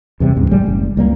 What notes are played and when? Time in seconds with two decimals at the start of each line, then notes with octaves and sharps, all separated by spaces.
0.20 E2 C3 G3
0.36 C#2 G#2
0.51 A1 G3 G#3
0.66 F#1
0.97 C#2 G3 A#3